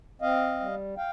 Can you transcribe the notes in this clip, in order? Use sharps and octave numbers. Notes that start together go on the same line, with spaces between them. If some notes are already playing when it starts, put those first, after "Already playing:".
C4 D#5 F5
G3
F5 G5